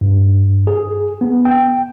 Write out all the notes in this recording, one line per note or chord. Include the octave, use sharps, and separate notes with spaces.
G2
G#4
B3
G5